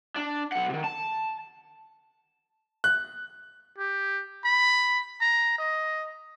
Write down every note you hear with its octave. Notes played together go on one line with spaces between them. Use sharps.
D4
B1 F#5
C3 D#3
A5
F#6
G4
B5
A#5
D#5